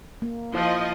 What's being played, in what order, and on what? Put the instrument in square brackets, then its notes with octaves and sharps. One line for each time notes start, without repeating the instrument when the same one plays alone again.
[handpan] A#3
[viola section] F3 D#5 [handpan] A#3 E4 F5